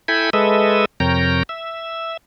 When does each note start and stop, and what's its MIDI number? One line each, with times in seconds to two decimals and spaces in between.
0.08 0.30 64
0.08 0.30 69
0.08 0.30 79
0.08 0.30 80
0.08 0.30 83
0.33 0.85 56
0.33 0.85 69
0.33 0.85 71
0.33 0.85 75
0.33 0.85 76
1.00 1.43 41
1.00 1.43 48
1.00 1.43 70
1.00 1.43 73
1.00 1.43 79
1.00 1.43 82
1.49 2.17 76